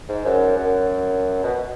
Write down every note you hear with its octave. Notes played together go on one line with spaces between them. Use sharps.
G#2
F#2
F#2
B2